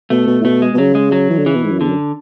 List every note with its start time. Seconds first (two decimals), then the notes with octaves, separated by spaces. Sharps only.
0.10 B2 A3
0.27 B2
0.41 A2
0.44 B2 A3
0.62 G#3
0.74 B2
0.78 C#3 F#3
0.95 G#3
1.12 F#3
1.30 E3
1.39 D3
1.46 C#3 E3
1.55 B2
1.64 G#2
1.71 F#2
1.80 E2 D3
1.89 F#2